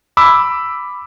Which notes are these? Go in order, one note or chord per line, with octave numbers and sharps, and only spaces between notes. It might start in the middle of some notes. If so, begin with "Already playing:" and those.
B5 D6 E6